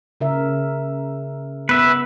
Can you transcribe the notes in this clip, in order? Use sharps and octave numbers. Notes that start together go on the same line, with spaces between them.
C#3 A#4 E5
B3 B4 E5